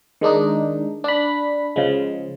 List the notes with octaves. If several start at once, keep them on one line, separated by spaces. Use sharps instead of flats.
D#3 G#3 D4 D#4
D4 B5
C#3 F3 G#3